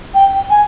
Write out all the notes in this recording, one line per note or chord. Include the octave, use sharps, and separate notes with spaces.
G5
G#5